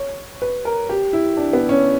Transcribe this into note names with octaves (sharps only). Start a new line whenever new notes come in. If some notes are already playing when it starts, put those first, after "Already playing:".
Already playing: C#5
B4
A#4
G4
E4
D4
B3
C#4